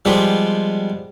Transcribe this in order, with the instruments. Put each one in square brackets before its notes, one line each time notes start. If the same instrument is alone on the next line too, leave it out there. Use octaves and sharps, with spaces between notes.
[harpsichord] F3 G3 G#3 B3 F4 G4